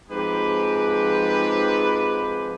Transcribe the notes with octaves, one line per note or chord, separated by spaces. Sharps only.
G#2 F3 G#3 C4 G4 B4